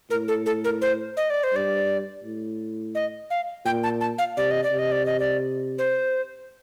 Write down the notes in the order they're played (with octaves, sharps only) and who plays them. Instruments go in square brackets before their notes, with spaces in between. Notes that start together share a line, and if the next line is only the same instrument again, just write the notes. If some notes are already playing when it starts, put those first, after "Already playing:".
[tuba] A2 [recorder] A#4
[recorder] A4
A4
A#4
C5
D#5
D5
C5
[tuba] G2 [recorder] D5
[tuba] A2
[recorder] D#5
F5
[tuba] A#2 [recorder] G5
[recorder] A5
A5
F5
[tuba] C3 [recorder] D5
[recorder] D#5
D5
[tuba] C3
[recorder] D#5
D5
D#5
D5
C5